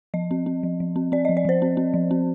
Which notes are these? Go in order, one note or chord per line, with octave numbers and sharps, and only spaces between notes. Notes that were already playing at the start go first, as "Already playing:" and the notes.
F3 D#5
C4
C4
F3
F3
C4
C4 D5
D#5
F3
D5
F3 C5
C4
C4
F3
C4